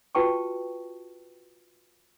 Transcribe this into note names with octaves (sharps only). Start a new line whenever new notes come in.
F4 F#4 B4 G5 A5 C#6